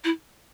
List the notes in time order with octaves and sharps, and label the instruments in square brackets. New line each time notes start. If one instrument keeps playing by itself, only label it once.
[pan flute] E4